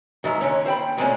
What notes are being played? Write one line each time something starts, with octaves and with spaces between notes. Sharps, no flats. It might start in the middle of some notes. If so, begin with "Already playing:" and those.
G#2 D#3 E5 A#5
D#2 D3 C#4
C5 G5 B5
D2 A#2 G#3 A3 C4 C#4